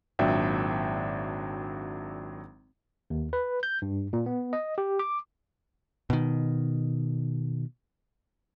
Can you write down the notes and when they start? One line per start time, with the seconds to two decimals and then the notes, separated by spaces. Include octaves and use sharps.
0.19 G#1 A#2 F#3 D4 E5 G5
3.10 D#2
3.33 B4
3.63 G6
3.82 G2
4.13 A#2
4.26 B3
4.53 D#5
4.78 G4
4.99 D6
6.10 B2 D#3